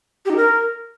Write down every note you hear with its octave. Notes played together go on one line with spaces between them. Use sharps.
G4
D#4
A#4